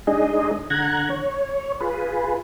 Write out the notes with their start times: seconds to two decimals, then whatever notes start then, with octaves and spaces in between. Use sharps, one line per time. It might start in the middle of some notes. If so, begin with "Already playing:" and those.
0.07 G#3 D4 D#4 G#4 D#5
0.70 D3 F#5 A#5 F#6 G#6
1.10 C#5
1.81 F4 G#4 B4